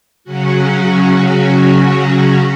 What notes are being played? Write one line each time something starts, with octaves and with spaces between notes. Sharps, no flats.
C#3 F#3 C#4 F#4